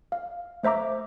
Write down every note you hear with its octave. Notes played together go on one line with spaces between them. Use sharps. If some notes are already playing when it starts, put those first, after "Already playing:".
F5
A3 C5 E5 A#5 D6